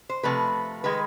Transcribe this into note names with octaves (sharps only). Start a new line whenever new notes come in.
C5
C3 F3 A3 B4
D#3 G#3 B4